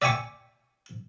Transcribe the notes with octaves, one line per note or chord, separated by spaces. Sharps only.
D5 E5 G5 G#5 C#6 D6